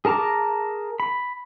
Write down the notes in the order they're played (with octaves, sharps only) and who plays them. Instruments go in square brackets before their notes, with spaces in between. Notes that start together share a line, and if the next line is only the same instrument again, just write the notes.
[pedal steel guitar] G#4 A#4 A5 A#5 D6
B5